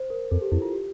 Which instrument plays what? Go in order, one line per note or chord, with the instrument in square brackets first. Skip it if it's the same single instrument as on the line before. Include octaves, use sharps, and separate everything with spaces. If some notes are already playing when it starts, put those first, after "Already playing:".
Already playing: [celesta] C5
A#4
[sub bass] F2 [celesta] A4
[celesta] G4
[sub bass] F2 [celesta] E4
[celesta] F4
G4